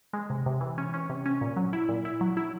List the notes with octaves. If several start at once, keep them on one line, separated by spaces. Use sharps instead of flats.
G#3
C3
C3
E3
C#4
C#4
C3
C#4
A#2
F#3
E4
A#2
E4
F#3
E4